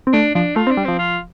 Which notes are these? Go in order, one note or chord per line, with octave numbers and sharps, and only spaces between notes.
C4
A3 D4
F3 D4
A3 F4
C4
D4
G3
F3 C4
F4